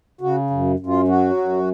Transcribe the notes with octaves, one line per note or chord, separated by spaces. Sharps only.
C#3 F#4
F#2
F#2
F4
F#3 F#4
F#2